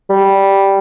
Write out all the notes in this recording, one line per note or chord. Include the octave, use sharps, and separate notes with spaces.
G3